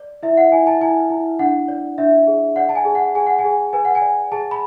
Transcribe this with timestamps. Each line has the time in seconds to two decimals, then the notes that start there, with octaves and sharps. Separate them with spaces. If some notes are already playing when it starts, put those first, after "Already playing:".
Already playing: D5
0.23 E4 E5
0.37 F#5
0.52 E4 G#5
0.67 A5
0.81 E4 G#5
1.10 E4
1.39 D4 F#5
1.68 D5
1.98 D4 E5
2.27 G#4
2.56 D5 F#5
2.69 A5
2.75 G#5
2.85 G#4
2.95 F#5
3.15 G#4 G#5
3.27 F#5
3.39 G#5
3.44 G#4
3.73 B4 G#5
3.85 F#5
3.95 G#5
4.02 D5
4.32 G#4 A5
4.51 B5